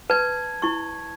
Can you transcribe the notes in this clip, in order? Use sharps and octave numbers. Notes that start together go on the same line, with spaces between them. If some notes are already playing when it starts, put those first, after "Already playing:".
B4 A5 G#6
E4 C#6